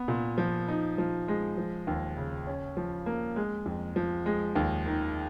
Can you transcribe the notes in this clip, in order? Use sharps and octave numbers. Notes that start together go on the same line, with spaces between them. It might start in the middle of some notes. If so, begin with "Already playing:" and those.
Already playing: B3
A#2
F3
D#4
F3
G#3
F3
D#2
C#3
C#4
F3
A#3
G#3
F2
F3
G#3
D#2
D#3